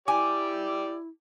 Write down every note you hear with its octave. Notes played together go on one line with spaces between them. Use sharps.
E4 G4 D5 G#5 D6